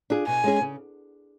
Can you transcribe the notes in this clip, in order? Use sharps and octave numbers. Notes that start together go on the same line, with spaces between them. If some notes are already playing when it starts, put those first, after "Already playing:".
D4 F4 G#4
B2 G#5
G#3 C#4 G#4
C#3